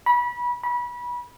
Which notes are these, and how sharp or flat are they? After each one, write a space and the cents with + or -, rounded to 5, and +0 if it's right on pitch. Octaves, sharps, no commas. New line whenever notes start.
B5 -25
B5 -25